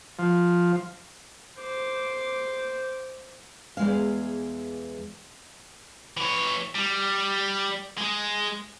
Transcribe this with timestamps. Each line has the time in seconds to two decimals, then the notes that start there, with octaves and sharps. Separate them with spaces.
0.19 F3
1.60 C5 D6
3.77 E2 G#3 F5
6.17 E3 C#5
6.75 G3
7.98 G#3